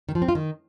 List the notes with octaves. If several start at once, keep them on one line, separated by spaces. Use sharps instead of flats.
D#3
F3
C4
F4
D#3